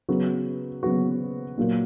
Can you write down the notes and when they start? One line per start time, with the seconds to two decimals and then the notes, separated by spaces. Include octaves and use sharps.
0.09 C#3 F#3 B3 F#4
0.83 C#3 F#3 B3 F#4
1.57 A#2 F#3 A#3 F4